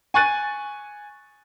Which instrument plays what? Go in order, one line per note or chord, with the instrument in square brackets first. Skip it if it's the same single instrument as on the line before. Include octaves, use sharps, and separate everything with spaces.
[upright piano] G#5 C#6 F#6 A6 D#7